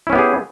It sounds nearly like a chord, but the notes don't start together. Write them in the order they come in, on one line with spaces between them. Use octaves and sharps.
E4 C#4 B3 G4 G#4